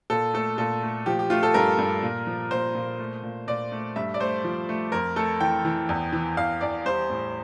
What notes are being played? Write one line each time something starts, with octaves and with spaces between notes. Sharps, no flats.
A#2 A4
A3 A4
A#2 A4
A3
F3 G4
G4
A3 F4
A4
G2 A#4
G2
A#2
F3
A#2 C5
A#2
A3
A#2
A#2 D5
A3
G2 E5
D5
A3 C5
F3
A3
F2 A#4
A3 A4
E3 G5
E3
E2
E3
E2 F5
E2 D5
G3 C5
A2